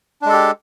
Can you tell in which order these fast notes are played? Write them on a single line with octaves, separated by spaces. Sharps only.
D4 G#3 A4 G4